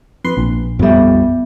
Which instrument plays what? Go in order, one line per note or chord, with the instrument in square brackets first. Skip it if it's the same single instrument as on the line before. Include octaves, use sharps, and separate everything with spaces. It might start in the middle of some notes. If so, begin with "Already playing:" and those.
[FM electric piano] F2 B4 C6
A#1
[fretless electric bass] F2 G3 [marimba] B3 E5